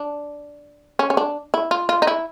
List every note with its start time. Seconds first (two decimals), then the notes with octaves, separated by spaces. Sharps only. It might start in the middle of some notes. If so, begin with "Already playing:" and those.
Already playing: D4
0.99 C#4
1.10 C#4
1.17 D4
1.54 E4
1.71 F4
1.89 F4
2.02 D#4
2.07 E4